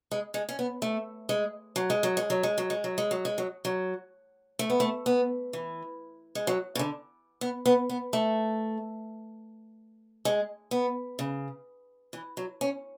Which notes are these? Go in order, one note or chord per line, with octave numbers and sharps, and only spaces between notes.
G#3
G#3
C#4
B3
A3
G#3
F#3
G#3
F#3
G#3
F#3
G#3
F#3
G#3
F#3
G#3
F#3
G#3
F#3
F#3
A3
B3
A3
B3
E3
G#3
F#3
C#3
D3
B3
B3
B3
A3
G#3
B3
C#3
E3
F#3
C#4